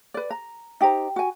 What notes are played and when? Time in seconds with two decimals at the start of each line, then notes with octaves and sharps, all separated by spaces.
0.14 B4 D5
0.31 A#5
0.81 D#4 G4 C5 A#5
1.16 F#4 G#5